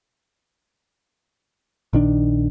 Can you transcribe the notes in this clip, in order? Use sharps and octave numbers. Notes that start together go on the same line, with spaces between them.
A#1 D#3 D4